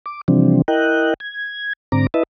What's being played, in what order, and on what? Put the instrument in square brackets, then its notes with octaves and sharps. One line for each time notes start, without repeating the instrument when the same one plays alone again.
[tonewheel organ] D6
C3 E3 F3 G3 C4 D4
E4 A#4 D#5 G5 F#6
G#6
G#2 D3 C4 A#5 D6
E4 B4 D#5 E5 A5